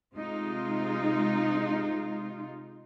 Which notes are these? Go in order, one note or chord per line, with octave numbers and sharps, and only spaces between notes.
C3 G#3 D#4 F4